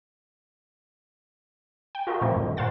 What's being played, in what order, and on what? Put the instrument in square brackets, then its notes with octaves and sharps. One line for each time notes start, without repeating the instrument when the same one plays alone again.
[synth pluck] G5
F4 F#4 A4 A#4 D#5
A#2 F3 F#3 A3 A#3 C4
G2 D#3
A#2 C5 F5 F#5 A6